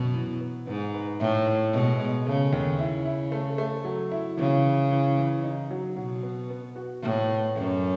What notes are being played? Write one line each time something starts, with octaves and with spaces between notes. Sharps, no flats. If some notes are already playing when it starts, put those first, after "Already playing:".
Already playing: F#2 B2
E3
B3
G#2 B3
B4
A2 E4
E4
B2 G#3
G#3
C#3 A3
D#2
C#3 E4
E4
A3
A3
F#3
E4
C#3 E3
E3
E3
E3
D#4
F#3
B2 F#3
B3
B3
F#4
A2 B3
B3
F#2 A3